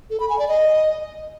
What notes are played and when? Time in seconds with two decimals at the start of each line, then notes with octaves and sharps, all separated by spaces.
0.10 A4
0.20 B5
0.29 G#5
0.39 D5
0.48 D#5